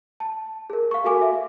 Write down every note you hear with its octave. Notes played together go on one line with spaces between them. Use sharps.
A5
G#4 A#4
F5 C#6
F#4 A4 A#4 F5 G#5 D6
E5